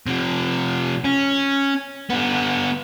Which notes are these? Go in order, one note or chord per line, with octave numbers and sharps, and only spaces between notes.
C3 F3
C#4
D3 B3